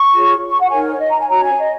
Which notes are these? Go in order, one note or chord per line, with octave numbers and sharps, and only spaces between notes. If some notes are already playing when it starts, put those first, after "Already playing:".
Already playing: C#6
F4 G#4 C#5
C#6
F#5
D#4 A#4 C#5 G#5
C#5
D#5
A#5
G#5
C#4 F#4 C#5 A#5
G#5
D#5